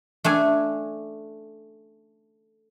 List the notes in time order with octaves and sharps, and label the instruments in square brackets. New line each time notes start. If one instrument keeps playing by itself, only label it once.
[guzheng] A3 D4 G#5